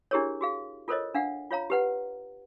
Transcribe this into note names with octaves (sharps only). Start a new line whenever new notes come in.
D4 E4 G4 G#4 A#4 C#5
F#4 G#4 F5
F4 A4 A#4 C5 C#5 D#5
D4 F5 F#5
F4 C#5 F5 A#5
G4 B4 F#5